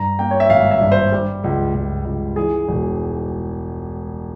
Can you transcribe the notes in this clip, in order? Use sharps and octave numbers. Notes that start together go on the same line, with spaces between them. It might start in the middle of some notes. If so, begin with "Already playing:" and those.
Already playing: G2 A#5
A#3 G5
C#5
E5
G#1 F5
E5
G2
C5
G3
C#2
C#2
C#2
E3 G#4
E1